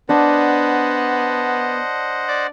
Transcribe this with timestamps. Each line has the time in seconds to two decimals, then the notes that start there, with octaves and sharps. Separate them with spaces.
0.09 B3 D4 C5 D#5 F#5
2.28 D5